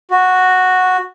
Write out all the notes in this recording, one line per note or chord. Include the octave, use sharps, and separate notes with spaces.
F#4